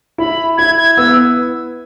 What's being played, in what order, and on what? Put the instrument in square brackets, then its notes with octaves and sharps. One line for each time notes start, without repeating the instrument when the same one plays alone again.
[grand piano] E4 [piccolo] B5
[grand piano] E4 [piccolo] G#6
[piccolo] G#6
[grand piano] B3 [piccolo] E6